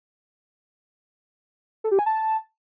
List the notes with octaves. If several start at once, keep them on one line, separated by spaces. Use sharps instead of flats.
A4
G4
G#5
A5